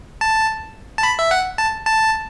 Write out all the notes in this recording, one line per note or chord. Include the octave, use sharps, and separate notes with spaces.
A5
A5
B5
E5
F#5
A5
A5